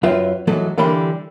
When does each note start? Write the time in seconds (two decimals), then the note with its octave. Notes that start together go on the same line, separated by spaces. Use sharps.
0.03 F#2 F#3 F4 B4 E5 G5
0.47 E3 F#3 G#3 A3 F#4 A4
0.78 D3 E3 G3 A#4 B5 C6